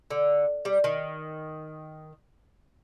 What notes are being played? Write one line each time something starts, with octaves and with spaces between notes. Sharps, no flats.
D3
G3
D#3